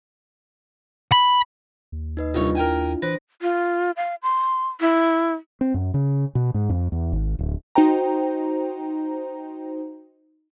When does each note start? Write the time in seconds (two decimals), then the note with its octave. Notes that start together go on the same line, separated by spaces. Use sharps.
1.12 B5
1.92 D#2
2.17 D#4 B4 D#5
2.34 C2 D4 E4 F4 C#5
2.55 A#4 G5 G#5
3.02 E3 D4 B4 C5 A#6
3.42 F4
3.97 F5
4.23 C6
4.81 E4
5.61 C4
5.74 F#2
5.94 C#3
6.35 B2
6.54 G#2
6.69 F2
6.92 E2
7.13 G#1
7.39 D1
7.75 D#4 F#4 C5 G5 A#5